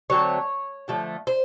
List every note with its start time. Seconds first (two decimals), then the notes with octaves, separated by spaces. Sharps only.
0.10 D3 F#3 A3 C4 C#5
0.88 D3 F3 A3
1.27 C5